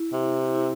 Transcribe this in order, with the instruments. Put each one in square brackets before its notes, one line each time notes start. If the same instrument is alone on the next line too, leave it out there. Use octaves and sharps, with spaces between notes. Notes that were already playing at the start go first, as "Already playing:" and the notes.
Already playing: [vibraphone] E4
[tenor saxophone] C3
[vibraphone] E4